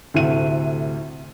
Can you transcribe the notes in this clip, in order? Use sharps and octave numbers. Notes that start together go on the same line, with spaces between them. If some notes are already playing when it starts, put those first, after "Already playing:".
D2 A2 C3 D#7